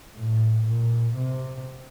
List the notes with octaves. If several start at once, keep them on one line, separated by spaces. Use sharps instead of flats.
A2
A#2
C3